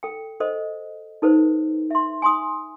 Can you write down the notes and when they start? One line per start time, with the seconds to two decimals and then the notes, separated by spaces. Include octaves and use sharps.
0.03 A4 G5
0.40 A4 C5 D#5
1.22 D#4 A4 B4 C5
1.90 E5 C6
2.22 G#5 C6 D#6